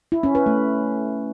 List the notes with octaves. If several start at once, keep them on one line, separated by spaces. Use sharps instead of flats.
E4
C#4
B4
A3